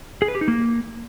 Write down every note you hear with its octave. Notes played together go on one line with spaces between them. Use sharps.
G#4
B4
G4
D#4
A#3